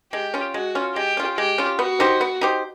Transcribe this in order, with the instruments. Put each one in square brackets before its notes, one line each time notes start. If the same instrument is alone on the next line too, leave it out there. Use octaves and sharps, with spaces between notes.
[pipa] G#3 [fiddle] G4
[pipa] C#4 F4
[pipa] G#3 [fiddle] F#4
[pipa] C#4 F4
[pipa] G#3 [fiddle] G4
[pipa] C#4 F4
[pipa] G#3 [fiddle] G4
[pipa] C#4 F4
[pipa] B3 [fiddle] F#4
[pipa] D#4 G4 C5
B3
D#4 G4 C5